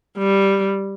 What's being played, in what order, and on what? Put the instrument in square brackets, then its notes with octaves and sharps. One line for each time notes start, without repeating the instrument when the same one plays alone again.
[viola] G3